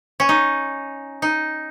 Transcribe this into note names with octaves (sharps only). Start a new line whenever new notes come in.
C#4
D#4
D#4